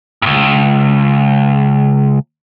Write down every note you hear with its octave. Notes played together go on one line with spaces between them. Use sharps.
C#2 G2